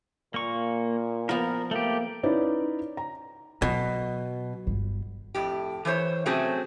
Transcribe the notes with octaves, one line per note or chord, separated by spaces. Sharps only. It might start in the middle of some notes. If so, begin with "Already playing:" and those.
A#2 A#3 C#6
F3 B3 A#4
A3 A#3 G4
C#4 D#4 E4 B4 D5
A#5
B2 F#3
G1
F2 A2 G4
E3 E4 C5 C#5
C3 F#3 A3 C4 C#4 G#4